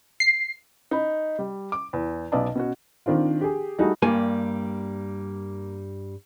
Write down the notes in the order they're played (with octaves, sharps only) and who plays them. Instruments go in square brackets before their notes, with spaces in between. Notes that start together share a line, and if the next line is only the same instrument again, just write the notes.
[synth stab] C7
[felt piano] D#4 B5
G3
D6
E2
B1 B2 B4 D5 D#5 A5
B2 C#4 F#4
[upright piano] D#3 C4 D4 F4
G4 G#4
G3 A3 D#4 F#4 G#4 A4
[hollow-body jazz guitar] G2 G3 G#5 [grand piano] A#3